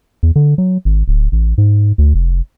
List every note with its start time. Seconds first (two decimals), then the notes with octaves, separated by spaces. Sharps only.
0.23 E2
0.36 D3
0.58 F#3
0.85 G#1
1.08 D1
1.32 A1
1.58 G#2
1.98 D2
2.14 F1